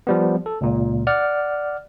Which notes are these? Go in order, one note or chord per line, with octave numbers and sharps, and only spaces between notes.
F3 G3 B3
A4
C#2 A#2
D5 F#5 F6